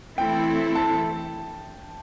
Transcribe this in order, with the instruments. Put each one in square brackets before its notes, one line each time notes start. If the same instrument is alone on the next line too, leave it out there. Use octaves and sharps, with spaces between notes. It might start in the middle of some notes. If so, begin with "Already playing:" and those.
[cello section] E3 A3 C4 E4 A4 [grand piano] G5
[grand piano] A5